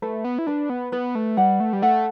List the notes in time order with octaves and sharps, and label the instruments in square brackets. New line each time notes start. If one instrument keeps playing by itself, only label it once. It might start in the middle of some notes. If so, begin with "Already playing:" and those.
[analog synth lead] A3 [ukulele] B4
[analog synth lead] B3
E4
[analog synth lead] D4 [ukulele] B4
[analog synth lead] B3
[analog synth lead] B3 [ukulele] B4
[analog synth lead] A3
[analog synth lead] G3 [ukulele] F#5
[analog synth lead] A3
G3
[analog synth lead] A3 [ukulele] F#5